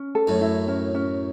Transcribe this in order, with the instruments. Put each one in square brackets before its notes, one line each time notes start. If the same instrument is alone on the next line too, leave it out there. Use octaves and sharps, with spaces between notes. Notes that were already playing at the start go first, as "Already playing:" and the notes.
Already playing: [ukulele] C#4
A4
[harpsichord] F#2 A2
[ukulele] E4
C#4
C#4